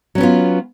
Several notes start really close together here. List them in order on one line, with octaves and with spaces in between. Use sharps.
F#3 C#4 B3 F4